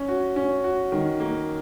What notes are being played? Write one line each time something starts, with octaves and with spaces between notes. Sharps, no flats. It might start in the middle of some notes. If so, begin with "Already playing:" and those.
Already playing: C#4
F#4
C#4
F#4
D#3
A#3